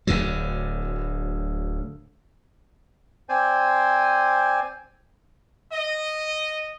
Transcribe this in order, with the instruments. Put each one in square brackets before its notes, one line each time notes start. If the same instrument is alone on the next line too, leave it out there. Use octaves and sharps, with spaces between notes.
[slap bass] D1 D2 D3 F#3
[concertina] C4 C5 D5 G#5
[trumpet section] D#5